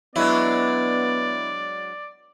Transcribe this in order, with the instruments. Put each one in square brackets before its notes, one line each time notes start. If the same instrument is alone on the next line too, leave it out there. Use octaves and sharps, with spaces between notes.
[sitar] F#3 G#3 D4 [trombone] B3 [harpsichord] E4 [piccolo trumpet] D5